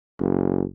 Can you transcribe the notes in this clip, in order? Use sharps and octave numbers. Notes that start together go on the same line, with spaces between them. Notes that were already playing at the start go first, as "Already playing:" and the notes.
F#1